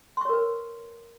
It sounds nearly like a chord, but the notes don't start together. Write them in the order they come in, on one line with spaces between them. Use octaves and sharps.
C6 C#6 C#5 A#4 B4